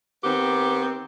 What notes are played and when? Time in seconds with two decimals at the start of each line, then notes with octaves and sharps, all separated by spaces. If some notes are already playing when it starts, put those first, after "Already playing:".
0.23 D#3 B3 C4 G4